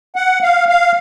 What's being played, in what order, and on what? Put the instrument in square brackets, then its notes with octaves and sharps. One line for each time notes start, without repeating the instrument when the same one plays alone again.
[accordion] F#5
F5
F5